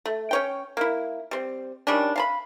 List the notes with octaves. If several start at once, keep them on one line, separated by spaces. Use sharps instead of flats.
A3
C#4 C#5 G5
A#3 E4
G3 C4
D#3 G3 C#4 D4
F5 A5 B5